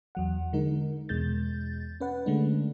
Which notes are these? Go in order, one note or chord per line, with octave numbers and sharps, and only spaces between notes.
E2 F#3 F#5
D3 G#3 D#4 A#4
E2 B2 G#3 G6 A6
C#4 B4 F#5
D3 G#3 A3 C#4 D4